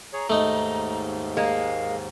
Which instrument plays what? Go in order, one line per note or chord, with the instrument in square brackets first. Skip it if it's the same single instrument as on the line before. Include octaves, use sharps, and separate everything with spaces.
[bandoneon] G#4 C#5 [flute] A#5
[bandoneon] D#2 G#2 [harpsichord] A3 D#4
[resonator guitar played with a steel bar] G#3 A#3 [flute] F5